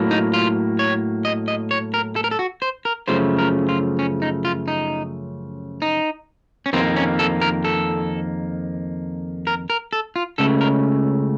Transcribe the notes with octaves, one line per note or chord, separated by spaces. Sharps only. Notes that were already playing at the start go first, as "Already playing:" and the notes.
Already playing: A2 F#3 A#3
D#4
F4
C#5
D#5
D#5
C#5
A#4
A4
A#4
A4
F#4
C5
A#4
F#2 C#3 F3 A3 C5
A#4
F4
C#4
D#4
F4
D#4
D#4
C#4
F2 D#3 A#3 C4
C#4
A4
A#4
A4
A#4
A#4
A4
F4
C#2 C#3 A3 A4
A#4